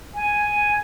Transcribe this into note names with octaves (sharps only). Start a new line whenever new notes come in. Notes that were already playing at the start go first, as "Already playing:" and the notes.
G#5